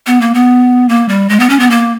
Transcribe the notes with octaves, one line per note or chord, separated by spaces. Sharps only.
B3
A#3
B3
A#3
G3
G#3
B3
C#4
B3
A#3